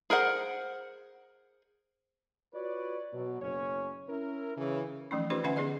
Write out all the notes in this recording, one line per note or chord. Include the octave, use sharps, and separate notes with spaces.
G#4 A#4 C5 F#5
F4 F#4 B4 C#5 D5
B2 F#3
F#1 C#4 C#5
C#4 E4 A#4
C#3 E3
E3 F3 A3 C#4 D#4
C#4 D#4 F4 G4 B4 C5
D3 C#4 B4 E5 F#5 G#5
B3 D#4 G#4 D5 D#5